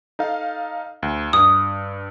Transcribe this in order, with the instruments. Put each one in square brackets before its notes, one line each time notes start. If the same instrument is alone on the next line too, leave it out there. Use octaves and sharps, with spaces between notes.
[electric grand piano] D#4 A4 F5
D2
[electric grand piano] G2 [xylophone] D#6